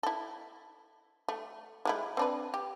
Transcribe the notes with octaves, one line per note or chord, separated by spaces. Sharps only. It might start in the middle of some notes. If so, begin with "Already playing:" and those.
E4 A4
A3
G#3 A3 E4
C4 D4 B4
G4